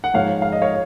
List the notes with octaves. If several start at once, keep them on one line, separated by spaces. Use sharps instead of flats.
F#5
G#2 F3 G#3 C#5 F5
F5
D#5
C#5 F5